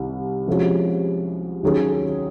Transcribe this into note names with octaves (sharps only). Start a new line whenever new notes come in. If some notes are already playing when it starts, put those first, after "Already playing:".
Already playing: C2 C3 D#3
C3 F3 G#3 C#4 F#4
D#2 D#3 F#3 C#4 G#4